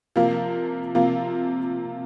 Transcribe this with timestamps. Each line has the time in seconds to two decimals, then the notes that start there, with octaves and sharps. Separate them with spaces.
0.16 C3 F3 A#3 F4
0.95 C3 F3 A#3 F4